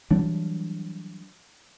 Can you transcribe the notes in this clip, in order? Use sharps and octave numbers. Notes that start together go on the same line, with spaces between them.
E3 F#3 G3 D4